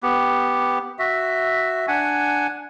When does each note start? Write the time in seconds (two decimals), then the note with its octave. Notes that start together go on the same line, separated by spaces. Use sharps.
0.03 B3 G4
0.99 F#4 E5
1.88 D4 F#5 G#5